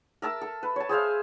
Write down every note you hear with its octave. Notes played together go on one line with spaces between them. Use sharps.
A#4 E5 A5 E6
A4
B4
C#5 A5
G#4 C5 E5 F5